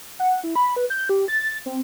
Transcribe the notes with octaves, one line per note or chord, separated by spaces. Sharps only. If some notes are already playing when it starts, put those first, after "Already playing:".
F#5
E4
B5
B4
G6
G4
A6
C4